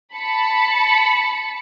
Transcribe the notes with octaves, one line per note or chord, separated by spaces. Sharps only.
A5 B5 C#7